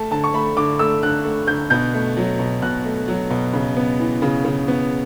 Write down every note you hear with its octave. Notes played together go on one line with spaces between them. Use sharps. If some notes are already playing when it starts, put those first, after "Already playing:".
Already playing: A3 A5
D3 A5
C#6
A3 B5
D3 D6
A3 E6
D3 F#6
A3
D3 G6
B2 G6
A3
F#3
B2
B2 F#6
A3
F#3
B2
C#3
B3
E3
C#3
C#3
B3